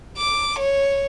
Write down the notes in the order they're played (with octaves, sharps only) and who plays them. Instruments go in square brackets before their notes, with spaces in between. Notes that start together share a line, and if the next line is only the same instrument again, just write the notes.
[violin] D6
C#5